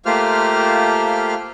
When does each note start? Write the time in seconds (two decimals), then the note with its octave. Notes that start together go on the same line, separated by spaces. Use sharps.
0.06 A3 A#3 F4 G4 C5 F6